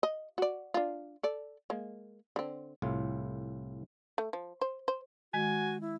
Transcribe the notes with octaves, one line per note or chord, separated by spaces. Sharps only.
D#5
F#4 D5
D4 F4
A4 D5
G#3 A#3
D3 C4
C2 A2 F4
A3
F3
C5
C5
D#3 G#3 F#4 G#5
E4